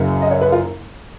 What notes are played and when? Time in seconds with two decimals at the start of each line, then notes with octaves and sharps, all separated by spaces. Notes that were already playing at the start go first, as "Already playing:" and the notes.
Already playing: F#1 F#2 C#3
0.22 D#5
0.31 C#5
0.41 B4
0.52 F4